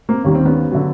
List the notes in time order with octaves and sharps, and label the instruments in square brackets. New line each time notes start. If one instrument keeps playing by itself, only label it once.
[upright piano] A#3 C4
D#2 D#3 G3 C#4
C4
B3 C#4
D3 F#3